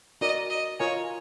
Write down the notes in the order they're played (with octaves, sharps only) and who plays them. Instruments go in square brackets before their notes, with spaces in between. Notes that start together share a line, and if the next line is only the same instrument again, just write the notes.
[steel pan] D#4 F#4 A#4 D5 [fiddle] D#5
[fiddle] D#5
[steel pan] F4 A#4 D#5 G#5 [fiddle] C#5